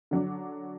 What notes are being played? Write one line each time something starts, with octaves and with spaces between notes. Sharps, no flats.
D3 F#3 D4